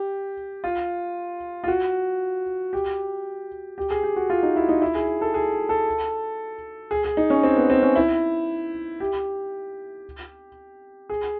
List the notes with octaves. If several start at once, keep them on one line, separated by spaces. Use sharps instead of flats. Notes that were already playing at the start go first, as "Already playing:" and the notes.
Already playing: G4
F4
F4
F#4
G4
G4
G#4
G4
F#4
F4
D#4
E4
D#4
E4
G#4
A4
G#4
A4
G#4
G#4
D#4
C#4
C4
B3
C4
C#4
E4
G4
G#4